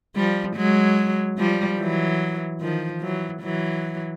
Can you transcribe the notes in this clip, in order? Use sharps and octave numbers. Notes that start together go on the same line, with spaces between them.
F3 G3
F#3 G#3
F3 G3
E3 F#3
D#3 F3
E3 F#3
E3 F#3